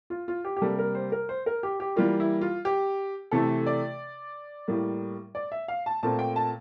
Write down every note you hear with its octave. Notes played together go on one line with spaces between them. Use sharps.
F4
F4
G4
G4
C3 G3 A#3 A4
A#4
C5
A#4
C5
A#4
G4
G4
E3 G3 A#3 F4
E4
F4
G4
C3 E3 A3 A4
D5
A2 G3 A#3
D5
E5
F5
A5
A#2 A3 C4 A5
G5
A5